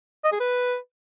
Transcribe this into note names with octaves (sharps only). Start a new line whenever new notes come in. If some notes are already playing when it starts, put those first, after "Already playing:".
D#5
G#4
B4